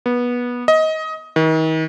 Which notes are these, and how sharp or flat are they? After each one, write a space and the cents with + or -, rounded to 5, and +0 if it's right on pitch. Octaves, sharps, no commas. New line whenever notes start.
B3 -20
D#5 +20
D#3 +40